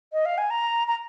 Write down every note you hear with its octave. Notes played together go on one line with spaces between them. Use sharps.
D#5
F5
G#5
A#5
A#5